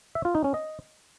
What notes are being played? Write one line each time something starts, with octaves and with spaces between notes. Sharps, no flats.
E5
F4
D#4
C#4
D#5